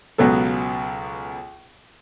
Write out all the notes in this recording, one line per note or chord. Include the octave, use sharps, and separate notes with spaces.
C#2 B2 F#3 B3 A4